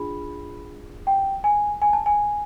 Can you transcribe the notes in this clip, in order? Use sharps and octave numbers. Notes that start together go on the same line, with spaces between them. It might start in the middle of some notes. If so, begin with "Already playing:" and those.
Already playing: D4 F4 G#4 B5
G5
G#5
G#5
A5
G#5